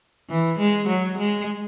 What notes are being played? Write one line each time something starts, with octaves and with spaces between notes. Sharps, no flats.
E3
G#3
F#3
G#3